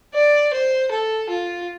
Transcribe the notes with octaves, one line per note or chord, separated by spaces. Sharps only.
D5
C5
A4
F4